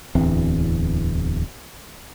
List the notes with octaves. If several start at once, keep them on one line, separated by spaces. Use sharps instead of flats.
D1 E2 E3 C4